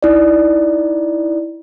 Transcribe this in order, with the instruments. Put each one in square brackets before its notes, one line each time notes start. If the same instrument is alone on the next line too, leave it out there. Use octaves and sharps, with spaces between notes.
[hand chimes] D#4 E4 D5